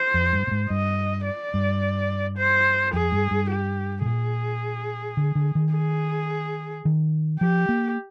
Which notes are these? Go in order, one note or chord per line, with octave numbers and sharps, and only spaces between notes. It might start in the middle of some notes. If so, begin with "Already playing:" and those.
Already playing: C5
F2
G2
A#2
G#2
G2 D#5
D5
G2
C5
F2 G#4
G2
G2
G4
C3
A#2 G#4
D3
D3
D#3
G#4
D#3
F3 G4
A#3